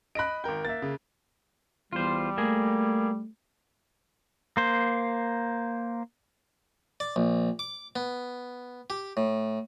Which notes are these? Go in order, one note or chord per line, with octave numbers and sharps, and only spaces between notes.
D#5 B5 F#6 A#6 D7
G#1 A#4 G5 G6
A#3 E5 A6
C#3
E2 G3 F4 C5
A3 A#3 G#4
A#3 C5
D5
A#1
D6
B3
G4
A2